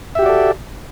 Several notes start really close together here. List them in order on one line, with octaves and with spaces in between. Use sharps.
E5 G4 F#4 D5 A4